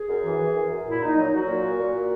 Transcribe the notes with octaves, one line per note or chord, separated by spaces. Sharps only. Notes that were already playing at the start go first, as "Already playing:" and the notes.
Already playing: G#4
F#2
E3
E3
F#2
F#2
A#2 E4
A#2 D#4
F#3 D#4
F#3 F#4
A#2
A#2
A#2
A#2